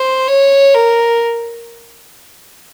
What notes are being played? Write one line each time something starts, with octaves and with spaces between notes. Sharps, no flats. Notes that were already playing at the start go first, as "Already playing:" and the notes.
Already playing: C5
C#5
A#4